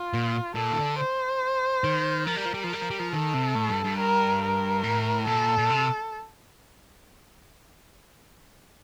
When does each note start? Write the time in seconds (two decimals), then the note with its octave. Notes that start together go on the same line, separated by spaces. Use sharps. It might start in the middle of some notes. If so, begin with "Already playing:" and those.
Already playing: F4
0.13 A#2
0.56 A#2 A4
0.73 D#3
0.78 D3
0.99 C5
1.84 D#3
2.27 F3 A#4
2.36 G3
2.45 F3
2.54 G3
2.64 F3
2.70 G3 A#4
2.82 F3
2.90 G3
3.00 F3
3.12 D#3 A4
3.34 C3
3.55 A2
3.70 G2
3.85 G2
3.98 A#4
4.42 A#4
4.83 A2
5.27 A#2 A4
5.58 A#2
5.70 C3